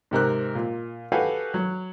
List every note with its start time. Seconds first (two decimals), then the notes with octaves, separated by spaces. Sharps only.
0.11 G#2 C3 A#4 F#6
0.55 A#2
1.12 F#4 G4 A4 B4 F5 G#5
1.54 F#3